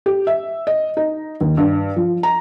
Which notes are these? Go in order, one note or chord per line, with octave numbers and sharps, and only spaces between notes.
G4
E5
D#5
D#4
D#2
G2
F3
A#5